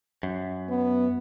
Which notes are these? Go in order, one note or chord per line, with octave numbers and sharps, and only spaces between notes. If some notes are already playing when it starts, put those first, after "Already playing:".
F#2
B3